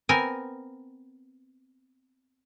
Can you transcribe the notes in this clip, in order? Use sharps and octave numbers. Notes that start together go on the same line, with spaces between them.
B3 C4 A#4 G#5